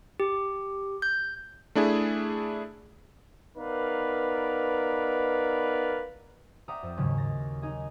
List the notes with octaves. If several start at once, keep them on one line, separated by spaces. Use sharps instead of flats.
G4
G6
A3 D4 E4 G#4
B3 D#4 A#4 B4 D5 F5
D5 E5 F#5 G5 A#5 D#6
F2
D#2 G#2 C#3 F#3
A6 A#6
D#4 G#4 D#5 G#5